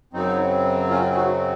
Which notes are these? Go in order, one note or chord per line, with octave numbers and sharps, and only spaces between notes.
F#2 C#3 F#3 C4 D#4
C#4 F4
G#4
D#4 F#4